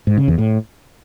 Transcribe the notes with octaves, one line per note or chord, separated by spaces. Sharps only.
G#2
C#3
E2
A2